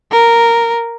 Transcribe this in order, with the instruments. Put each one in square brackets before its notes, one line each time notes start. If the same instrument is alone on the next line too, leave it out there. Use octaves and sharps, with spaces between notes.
[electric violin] A#4